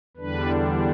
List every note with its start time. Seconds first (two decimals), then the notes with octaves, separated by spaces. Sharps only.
0.17 E2 D3 G3 D4 B4